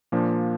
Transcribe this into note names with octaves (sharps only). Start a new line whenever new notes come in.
A#2 F3 A#3 D4